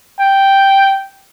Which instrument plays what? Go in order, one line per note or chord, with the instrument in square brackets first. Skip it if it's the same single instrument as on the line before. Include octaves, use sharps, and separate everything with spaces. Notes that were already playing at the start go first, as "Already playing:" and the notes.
[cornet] G5